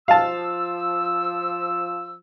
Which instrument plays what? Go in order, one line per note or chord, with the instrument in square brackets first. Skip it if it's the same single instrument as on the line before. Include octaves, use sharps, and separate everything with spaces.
[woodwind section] F3 E6 [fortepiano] F5 A5